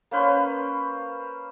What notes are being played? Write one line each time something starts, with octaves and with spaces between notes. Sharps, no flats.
A#3 C#4 B4 C5